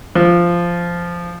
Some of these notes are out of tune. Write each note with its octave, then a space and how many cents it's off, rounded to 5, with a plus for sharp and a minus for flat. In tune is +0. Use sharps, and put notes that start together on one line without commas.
F3 -10